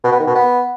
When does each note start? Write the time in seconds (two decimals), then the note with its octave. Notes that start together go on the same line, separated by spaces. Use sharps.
0.04 B2
0.12 B3
0.19 D#3
0.27 B2
0.35 B3